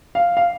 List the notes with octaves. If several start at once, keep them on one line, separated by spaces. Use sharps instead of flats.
F5
F5